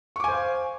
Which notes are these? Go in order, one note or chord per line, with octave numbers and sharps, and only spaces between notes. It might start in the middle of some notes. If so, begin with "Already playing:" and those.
C5 F5 G#5 C#6 D6